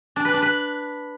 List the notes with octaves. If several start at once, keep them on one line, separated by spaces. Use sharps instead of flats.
D4
B4
D4
B4